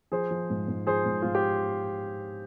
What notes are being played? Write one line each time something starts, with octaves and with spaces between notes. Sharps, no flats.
F3 G#4 C5
F3
G#2
G#2
F3 G#4 C5
G#2
G#2 F4
G4